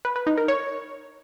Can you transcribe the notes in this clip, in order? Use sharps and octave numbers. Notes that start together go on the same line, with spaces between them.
B4
B4
D#4
A#4
C#5